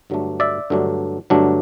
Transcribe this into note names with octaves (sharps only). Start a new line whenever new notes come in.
G2 D3 F#3 A3 D4
D5 E5
G2 D3 F#3 A3 D4
G2 D3 F#3 A3 D4